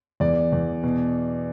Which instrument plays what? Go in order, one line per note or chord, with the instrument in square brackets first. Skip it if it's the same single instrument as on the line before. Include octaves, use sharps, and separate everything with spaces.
[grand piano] E2 D5
E2
B2